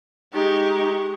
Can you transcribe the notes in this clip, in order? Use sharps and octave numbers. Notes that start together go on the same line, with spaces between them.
G#3 D#4 G4 C#6